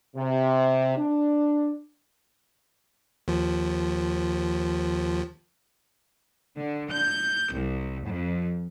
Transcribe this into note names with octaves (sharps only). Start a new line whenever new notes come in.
C3
D4
D#2 F3
D3
G6
C2
F2